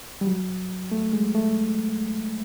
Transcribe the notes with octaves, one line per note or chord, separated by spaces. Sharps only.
G3
F#3
A3
G#3
A3